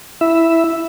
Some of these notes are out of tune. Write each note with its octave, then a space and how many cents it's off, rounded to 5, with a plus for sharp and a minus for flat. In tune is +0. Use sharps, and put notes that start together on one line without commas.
E4 +0 E5 +0